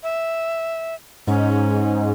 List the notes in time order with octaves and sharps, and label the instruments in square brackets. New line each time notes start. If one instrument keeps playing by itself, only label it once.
[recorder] E5
[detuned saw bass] G#2 [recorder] C#4